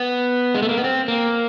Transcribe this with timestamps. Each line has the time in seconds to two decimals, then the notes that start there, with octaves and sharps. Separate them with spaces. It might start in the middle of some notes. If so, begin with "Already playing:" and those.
Already playing: B3
0.55 G#3
0.62 A3
0.69 A#3
0.77 B3
0.84 C4
1.08 A#3